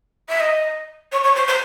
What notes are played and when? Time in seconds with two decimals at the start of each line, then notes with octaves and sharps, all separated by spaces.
0.29 E5
0.40 D#5
1.12 C#5
1.23 C#5
1.35 C5
1.48 C5